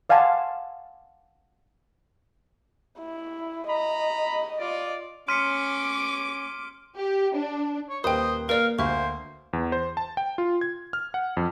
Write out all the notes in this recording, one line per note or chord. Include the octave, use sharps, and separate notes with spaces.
D5 F5 F#5 G#5 A5 C6
E4
D#5 A#5 B5
F4 D5
C#4 C6 D6 F6 B6 C#7 D#7
G4
D4
C#5
D#1 A#3 B4 C5 D#5 G5 D#6
A#3 A#4 B4 D5 F5
D2 A#3 C5 E5 C#6
E2
C5
A5
G5
F4
G#6
F6
F#5
F2